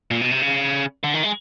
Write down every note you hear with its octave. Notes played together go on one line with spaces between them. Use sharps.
A#2
B2
C3
C#3
D3
D#3
G#3